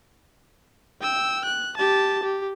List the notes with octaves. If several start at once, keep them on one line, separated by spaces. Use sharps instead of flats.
G5 E6
F#6
G4 A5
G4